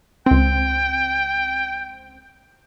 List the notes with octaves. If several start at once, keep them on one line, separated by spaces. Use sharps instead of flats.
C#2 C4 G5